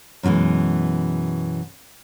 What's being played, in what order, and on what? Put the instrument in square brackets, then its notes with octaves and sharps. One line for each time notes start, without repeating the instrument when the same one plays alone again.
[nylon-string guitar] F#2 B2 D#3 E3 G#3